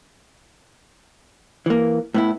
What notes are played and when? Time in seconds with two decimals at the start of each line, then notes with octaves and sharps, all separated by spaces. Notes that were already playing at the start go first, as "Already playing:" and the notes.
1.66 E3 A#3
2.14 A2 B3 E4